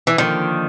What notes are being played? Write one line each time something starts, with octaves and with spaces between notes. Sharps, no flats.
E3
D3 D#3 F3 A#3